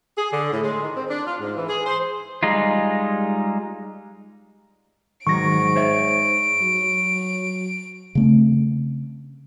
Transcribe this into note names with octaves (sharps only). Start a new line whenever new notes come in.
G#4
D3
A2
G#3
D#3
C4
D4
F4
G#2
E3
G#4
C5
G3 G#3 D#4 F4
G#2 D#3 F#3 C#6 A#6 D7
C5 C#5 E5
F#3
C#3 A3 C4